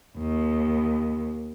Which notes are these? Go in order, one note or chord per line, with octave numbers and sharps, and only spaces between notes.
D#2